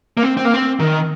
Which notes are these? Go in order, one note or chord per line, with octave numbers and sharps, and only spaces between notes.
A#3
C4
C4
A#3
C4
D#3